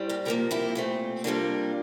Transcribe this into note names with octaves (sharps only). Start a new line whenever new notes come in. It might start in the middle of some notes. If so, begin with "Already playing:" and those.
Already playing: A2 G3 C4
G4 A#4
C3 F3 A#3 G4 A#4
E4 G4
A#2 A3 C4
C3 G3 A#3 D4 F4